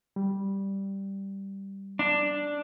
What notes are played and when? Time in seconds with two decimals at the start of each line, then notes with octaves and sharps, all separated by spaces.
0.16 G3
1.99 D4